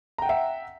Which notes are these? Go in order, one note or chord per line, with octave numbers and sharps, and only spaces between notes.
E5 F#5 G5 A#5